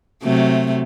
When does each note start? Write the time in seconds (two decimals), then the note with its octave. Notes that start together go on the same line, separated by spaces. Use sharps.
0.23 C3 F#3 A3